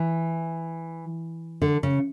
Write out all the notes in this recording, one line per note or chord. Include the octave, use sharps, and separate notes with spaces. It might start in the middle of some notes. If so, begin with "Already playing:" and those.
Already playing: E3
D3
C#3